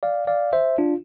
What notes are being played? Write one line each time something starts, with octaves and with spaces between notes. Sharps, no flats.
D5 F5
D5 F5
C5 E5
D4 F4